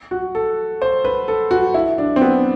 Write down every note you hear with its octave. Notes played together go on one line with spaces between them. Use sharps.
F#4
A4
C5
B4
A4
F#4
E4
D4
C4
B3